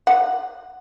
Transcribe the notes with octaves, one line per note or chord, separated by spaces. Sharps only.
F#5